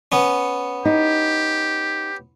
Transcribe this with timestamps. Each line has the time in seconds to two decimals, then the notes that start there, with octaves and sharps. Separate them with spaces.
0.12 B3 C#4
0.85 D#4 G4